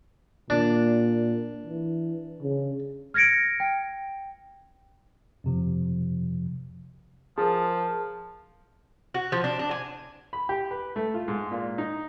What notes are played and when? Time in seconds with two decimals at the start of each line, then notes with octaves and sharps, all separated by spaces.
0.50 A#2 D4
1.66 E3
2.42 C#3
3.14 F6 G#6 A#6 C#7 D7
3.60 G5
5.44 F2 C3 F3
7.38 F3 G#4 A#4 A5
9.14 F#4
9.32 F3
9.44 D4
9.59 D4
9.71 G#5
10.33 B5
10.49 G4
10.71 B4
10.96 A3
11.14 F4
11.28 G#2
11.51 A#2
11.78 D#4